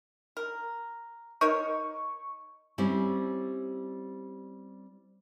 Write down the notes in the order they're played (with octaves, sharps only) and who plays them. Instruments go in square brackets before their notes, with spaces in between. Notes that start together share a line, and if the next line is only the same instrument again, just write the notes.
[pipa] A#4
[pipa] D#4 A#4 C#5 [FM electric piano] C#6
[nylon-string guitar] G3 C4 C#4 E4